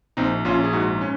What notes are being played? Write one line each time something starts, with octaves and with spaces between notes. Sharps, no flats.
A#1 C4 D#4
A#1 C#4 F4
G#4
G#2 D#4 F#4
C#4